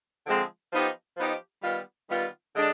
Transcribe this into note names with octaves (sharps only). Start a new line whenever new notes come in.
D3 F3 G#3 C4
F3 B3 D#4 G4
F3 B3 D#4 G4
D#3 G3 B3 F4
D#3 G3 B3 F4
D3 G#3 D4